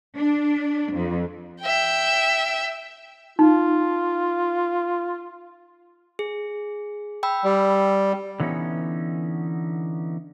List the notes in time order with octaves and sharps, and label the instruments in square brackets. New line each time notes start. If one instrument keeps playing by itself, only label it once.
[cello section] D4
F2
[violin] E5 G5
[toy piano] D#4 [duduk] F4
[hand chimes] G#4
G5 B5 E6
[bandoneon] G3
[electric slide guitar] D3 E3 F#3 B3 C#4 D#4